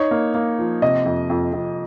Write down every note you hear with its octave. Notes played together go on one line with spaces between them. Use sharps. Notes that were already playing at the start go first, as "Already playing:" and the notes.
Already playing: D#4 C#5
A#3
A#3
F3
C3 D#5
F2
F2
F2